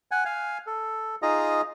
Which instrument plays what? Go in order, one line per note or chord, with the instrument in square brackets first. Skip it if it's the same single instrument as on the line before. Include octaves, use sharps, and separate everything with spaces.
[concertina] F#5 G#5
F5 G#5
A4
D#4 F4 G#4 D#5 A#5